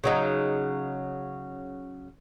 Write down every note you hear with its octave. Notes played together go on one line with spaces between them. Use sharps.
C#3 F#3 D#4